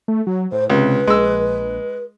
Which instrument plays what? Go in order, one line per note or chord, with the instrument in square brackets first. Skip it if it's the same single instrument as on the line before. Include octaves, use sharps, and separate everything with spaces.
[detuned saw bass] A3
F#3
[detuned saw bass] A2 [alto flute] C5
[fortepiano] C#2 [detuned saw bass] C3 [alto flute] B4
[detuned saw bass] A#1 [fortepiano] G#3 E6